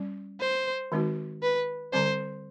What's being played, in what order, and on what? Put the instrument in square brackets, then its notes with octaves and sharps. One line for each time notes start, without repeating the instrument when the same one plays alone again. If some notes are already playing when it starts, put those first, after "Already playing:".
Already playing: [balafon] G3 C#4
[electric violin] C5
[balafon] D#3 G#3 C4 D#4 F#4
[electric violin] B4
[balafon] D3 G3 C4 [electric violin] C5